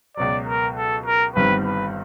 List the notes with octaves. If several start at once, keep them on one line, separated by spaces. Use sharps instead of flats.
C#2 B2 F#3 D5
A#4
A4
A#4
G1 G2 D#3 G3 C4 B4
B4